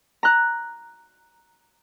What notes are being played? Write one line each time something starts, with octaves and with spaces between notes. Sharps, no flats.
A#5 F#6